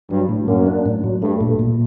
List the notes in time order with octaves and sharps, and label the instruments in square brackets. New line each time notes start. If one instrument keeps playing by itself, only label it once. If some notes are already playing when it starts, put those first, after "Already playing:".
[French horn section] G2 [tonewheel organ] F#3
[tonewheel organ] A2
[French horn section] F#2 [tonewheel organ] A#3
[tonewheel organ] D4
A2
F#3
[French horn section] G2 [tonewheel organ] A3
[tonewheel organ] A#2
A#2